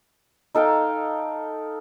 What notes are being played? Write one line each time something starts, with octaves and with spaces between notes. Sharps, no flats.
D#4 A4 F5 G5